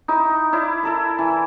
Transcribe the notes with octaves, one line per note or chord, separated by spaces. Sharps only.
D#4 E4 D6
E4 D5
E4 A4 A#4
E3